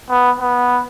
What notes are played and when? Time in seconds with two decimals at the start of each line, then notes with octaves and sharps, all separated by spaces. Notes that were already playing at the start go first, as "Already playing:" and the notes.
0.10 B3
0.40 B3